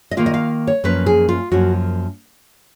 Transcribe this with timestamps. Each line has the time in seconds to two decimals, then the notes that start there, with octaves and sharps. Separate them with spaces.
0.11 D#5
0.17 D#3 A#3 F4 F5
0.26 D#5
0.34 F5
0.67 C#5
0.84 F#2 F3 A#3 C#4 B4
1.06 G#4
1.29 F4
1.52 F#2 F3 A#3 C#4 F#4